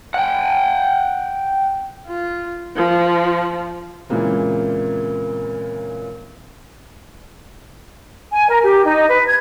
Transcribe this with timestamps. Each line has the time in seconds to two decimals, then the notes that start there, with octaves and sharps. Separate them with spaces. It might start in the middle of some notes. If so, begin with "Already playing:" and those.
0.14 F#5 G5
2.07 F4
2.76 F3
4.09 A#2 C#3 E3 G#3 A#3 C4
8.32 G#5
8.49 A#4
8.63 G4
8.85 D#4
9.08 B4
9.26 G#6